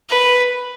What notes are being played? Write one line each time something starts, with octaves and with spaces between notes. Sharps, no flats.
B4